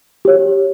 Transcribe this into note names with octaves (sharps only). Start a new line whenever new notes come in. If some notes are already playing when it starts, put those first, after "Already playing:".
G4 C#5